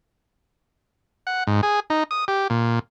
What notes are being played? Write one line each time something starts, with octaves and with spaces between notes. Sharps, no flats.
F#5
G#2
G#4
D#4
D#6
G4
A#2